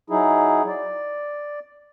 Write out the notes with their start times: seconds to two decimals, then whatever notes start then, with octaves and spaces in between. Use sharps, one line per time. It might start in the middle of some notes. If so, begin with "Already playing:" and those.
0.10 F#3 D#4 E4 G#4
0.68 D5